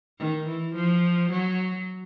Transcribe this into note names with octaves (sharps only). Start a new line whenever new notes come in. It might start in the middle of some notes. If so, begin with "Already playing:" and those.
D#3
E3
F3
F#3